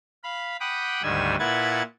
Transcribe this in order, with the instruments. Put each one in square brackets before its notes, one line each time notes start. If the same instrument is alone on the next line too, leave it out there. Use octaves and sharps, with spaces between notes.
[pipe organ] F5 B5
F#5 G5 B5 D6 D#6
D2 G#2 D#3 G3 G#5 E6
A#2 E4 B4 F#5 G#6 A6